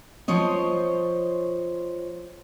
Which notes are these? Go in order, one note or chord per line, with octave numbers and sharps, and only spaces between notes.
F3 C5 C#5 D#5